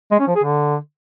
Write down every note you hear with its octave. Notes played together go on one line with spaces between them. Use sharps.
G#3
C#4
F3
G#4
D3